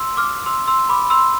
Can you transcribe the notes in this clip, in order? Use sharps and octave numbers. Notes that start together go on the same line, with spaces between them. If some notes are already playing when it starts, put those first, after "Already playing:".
Already playing: C6 E6
D6 F6
C6 E6
C6 E6
B5 D6
C6 E6